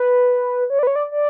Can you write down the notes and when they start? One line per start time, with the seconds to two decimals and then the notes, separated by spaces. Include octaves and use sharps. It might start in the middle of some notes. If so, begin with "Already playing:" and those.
Already playing: B4
0.70 C#5
0.79 D5
0.83 B4
0.87 C#5
0.96 D5
1.11 D5